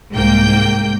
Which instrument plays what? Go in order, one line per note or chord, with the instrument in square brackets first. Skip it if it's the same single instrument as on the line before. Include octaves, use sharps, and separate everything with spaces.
[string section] C2 G#2 A#3 G5 G6